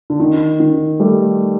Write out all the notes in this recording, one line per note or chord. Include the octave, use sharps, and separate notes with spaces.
D3
D#3
D#3
G3 A3